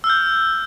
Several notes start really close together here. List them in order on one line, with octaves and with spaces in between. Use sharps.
E6 F6 G6